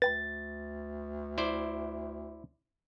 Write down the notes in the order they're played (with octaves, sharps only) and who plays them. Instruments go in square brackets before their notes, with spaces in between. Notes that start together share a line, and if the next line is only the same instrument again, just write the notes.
[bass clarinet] D2 [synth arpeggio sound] B4 G5 B5 [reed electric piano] A6
[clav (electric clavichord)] E4 C5 D5